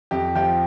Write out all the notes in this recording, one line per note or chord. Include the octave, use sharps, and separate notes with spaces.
F2 G4
F3 G4